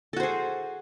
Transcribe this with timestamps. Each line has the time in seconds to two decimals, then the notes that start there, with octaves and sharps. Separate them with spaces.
0.13 A4
0.17 F#4
0.20 C5
0.23 G#4